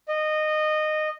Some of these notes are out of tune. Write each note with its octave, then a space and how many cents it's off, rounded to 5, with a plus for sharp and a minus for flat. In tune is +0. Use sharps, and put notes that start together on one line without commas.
D#5 -15